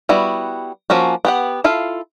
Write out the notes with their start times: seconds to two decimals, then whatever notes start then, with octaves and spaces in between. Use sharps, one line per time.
0.09 G3 B3 E4 F#4
0.90 F3 A#3 C#4 F#4
1.25 B3 G4 F#5
1.64 E4 F4 A4 F5